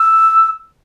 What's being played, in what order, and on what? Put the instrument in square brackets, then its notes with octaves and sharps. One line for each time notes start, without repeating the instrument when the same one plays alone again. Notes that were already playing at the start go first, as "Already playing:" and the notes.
Already playing: [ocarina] E6